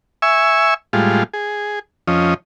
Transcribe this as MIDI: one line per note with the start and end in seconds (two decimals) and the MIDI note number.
0.22 0.74 76
0.22 0.74 80
0.22 0.74 85
0.22 0.74 88
0.93 1.23 45
0.93 1.23 55
0.93 1.23 56
0.93 1.23 65
1.34 1.79 68
2.08 2.34 41
2.08 2.34 53
2.08 2.34 61
2.08 2.34 75